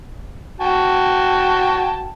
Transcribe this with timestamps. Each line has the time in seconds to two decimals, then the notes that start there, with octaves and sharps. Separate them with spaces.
0.61 F#4 G5 A5